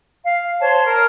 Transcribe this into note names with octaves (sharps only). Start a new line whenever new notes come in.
F5
C5 C#5 A5 C6
A#4